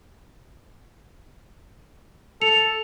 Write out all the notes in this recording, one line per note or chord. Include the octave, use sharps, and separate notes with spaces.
A4 C#7 F7